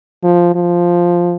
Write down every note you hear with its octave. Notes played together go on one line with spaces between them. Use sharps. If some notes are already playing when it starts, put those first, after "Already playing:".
F3
F3